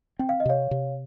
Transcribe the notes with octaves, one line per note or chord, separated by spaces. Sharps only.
C4 G5
F5
D#5
C3 C#5 F5
C3